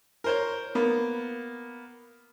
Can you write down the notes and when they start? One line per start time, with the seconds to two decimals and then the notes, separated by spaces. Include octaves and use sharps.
0.24 A#4 C5 C#5
0.75 A#3 B3